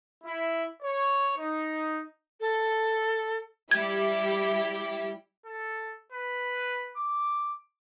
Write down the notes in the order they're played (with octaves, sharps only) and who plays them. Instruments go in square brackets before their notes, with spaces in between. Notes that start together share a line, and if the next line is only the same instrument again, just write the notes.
[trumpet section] E4
C#5
D#4
[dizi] A4
[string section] G3 E4 G4 [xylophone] G#6
[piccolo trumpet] A4
B4
D6